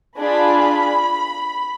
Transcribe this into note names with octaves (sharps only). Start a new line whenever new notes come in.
D4 F4 G#4 B5